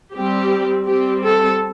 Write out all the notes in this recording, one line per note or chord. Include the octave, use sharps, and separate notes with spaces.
G3 C4 G4
G3 C4 G4
A4